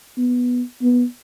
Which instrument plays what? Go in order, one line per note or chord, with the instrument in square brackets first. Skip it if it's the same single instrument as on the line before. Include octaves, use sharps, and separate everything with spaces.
[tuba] B3
B3